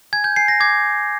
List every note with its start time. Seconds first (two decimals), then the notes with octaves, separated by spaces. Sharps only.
0.13 G#5 G#6
0.24 G6
0.36 G#5 C7
0.48 A#6
0.60 D6 G#6